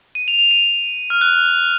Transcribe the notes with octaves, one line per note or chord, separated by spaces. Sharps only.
D#7
F7
F7
D#7
F6
F#6